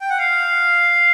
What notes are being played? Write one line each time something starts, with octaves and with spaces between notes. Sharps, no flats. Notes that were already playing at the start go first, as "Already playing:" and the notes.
G5
F#5
F5